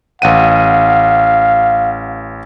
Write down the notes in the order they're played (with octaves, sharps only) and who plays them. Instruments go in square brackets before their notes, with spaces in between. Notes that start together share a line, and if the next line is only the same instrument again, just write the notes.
[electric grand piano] A1 F#5 D#7 [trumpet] F5